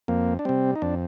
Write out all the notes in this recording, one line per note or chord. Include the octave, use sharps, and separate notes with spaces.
F2 A#3
D4
C3 G3 C4
D#4
F2 D4